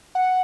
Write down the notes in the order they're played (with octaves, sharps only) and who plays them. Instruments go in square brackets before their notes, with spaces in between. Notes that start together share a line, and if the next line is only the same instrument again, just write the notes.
[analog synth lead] F#5